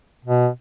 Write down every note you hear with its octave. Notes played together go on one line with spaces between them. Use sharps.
B2